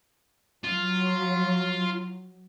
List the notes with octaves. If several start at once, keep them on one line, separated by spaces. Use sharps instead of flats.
F#3 F4